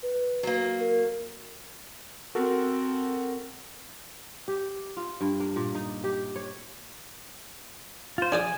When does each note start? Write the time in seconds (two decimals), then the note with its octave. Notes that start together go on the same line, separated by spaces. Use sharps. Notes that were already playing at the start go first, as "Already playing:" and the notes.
0.03 B4
0.43 F#3 A#3
0.80 A#4
2.35 C4 F#4 A4 A#4
4.48 G4
4.97 F4
5.21 G2
5.40 A#3
5.56 A#2
5.75 D#4
6.04 G4
6.36 C#5
8.18 F4 C5
8.32 D4 G#4 D5 G#5